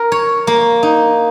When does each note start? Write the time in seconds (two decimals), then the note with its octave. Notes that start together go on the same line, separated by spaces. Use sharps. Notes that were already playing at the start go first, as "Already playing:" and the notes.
Already playing: A#4
0.12 C#5
0.47 A#3
0.83 D#4